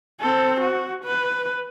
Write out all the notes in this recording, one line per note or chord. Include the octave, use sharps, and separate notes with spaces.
C4 A4
F#4
B4